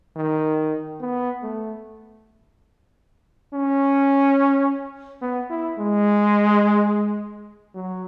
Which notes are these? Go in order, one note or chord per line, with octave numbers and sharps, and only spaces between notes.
D#3
B3
A3
C#4
B3
E4
G#3
F#3